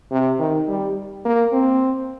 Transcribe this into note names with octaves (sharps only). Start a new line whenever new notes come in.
C3
D#3
G3
A#3
C4